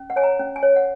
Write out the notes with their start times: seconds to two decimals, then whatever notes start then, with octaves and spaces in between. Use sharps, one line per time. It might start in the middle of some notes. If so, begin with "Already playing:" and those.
Already playing: C#4
0.10 F#5
0.16 C#5 G#5
0.23 A#5
0.40 C#4
0.56 G#5
0.63 C#5
0.76 F#5